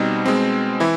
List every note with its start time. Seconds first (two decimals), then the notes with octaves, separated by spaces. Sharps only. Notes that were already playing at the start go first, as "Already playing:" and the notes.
Already playing: B2 G3 C4 D#4
0.26 B2 G#3 C4
0.80 E3 E4